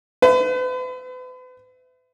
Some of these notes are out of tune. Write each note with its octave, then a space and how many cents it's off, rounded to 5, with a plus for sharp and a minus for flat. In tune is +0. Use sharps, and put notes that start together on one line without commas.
B4 +40 E5 +0